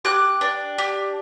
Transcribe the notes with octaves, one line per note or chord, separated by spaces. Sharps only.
G4 D6 F#6
D4
G4